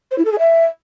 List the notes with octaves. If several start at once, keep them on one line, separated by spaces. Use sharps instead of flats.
C5
E4
A4
G#4
E5